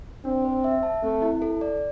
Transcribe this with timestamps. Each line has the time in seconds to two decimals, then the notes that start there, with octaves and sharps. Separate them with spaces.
0.25 C4 D4
0.45 C5
0.64 E5
0.83 A5
1.03 A3 C4
1.22 E4
1.42 A4
1.61 D5